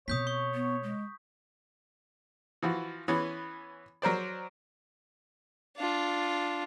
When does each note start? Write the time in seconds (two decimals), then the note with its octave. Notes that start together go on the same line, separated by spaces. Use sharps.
0.08 B2 C4 C#5 D#6 G6 B6
0.27 C#6
0.54 B3
0.83 G#3
2.62 E3 F3 F#4
3.08 E3 B3 C#4
4.02 F#3 A#4 C5 D5
5.77 D4 F4